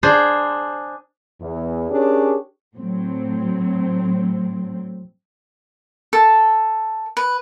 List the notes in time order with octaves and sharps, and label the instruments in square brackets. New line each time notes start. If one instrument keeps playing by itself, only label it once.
[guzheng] D4 G#4 C5
[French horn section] E2
C#4 D4 G4 G#4 A#4 C#5
[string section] A2 F#3 C4
[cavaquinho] A4
B4